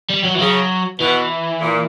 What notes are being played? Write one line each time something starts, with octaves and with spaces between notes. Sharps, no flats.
G3
F#3
E3
C#3 F#3
B2 E3
A#2